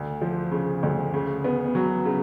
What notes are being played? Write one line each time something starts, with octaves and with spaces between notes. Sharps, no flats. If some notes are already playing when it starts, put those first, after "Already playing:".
Already playing: D2
F3
C#3
D2
C#3
B3
F#3
C#3